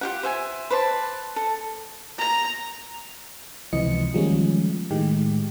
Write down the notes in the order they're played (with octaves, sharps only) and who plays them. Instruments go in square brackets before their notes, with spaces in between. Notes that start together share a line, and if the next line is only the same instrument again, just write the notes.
[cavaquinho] F4 G4 F#5
C5 E5 G#5
B4 C5 D5 A5
A4
[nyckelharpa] A#5
[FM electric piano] C#2 C3 E3 F3 D#5 C#7
D#3 F3 G3 G#3 A#3 C#4
A2 D#3 G#3 G4